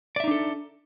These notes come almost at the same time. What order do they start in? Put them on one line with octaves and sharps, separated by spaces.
D5 E5 D#4 D4 A4